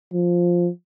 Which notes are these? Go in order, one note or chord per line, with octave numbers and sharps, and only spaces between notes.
F3